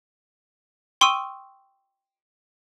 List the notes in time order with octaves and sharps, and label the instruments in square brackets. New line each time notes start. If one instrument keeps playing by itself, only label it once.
[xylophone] G5 C6 C#6 D#6 E6 D#7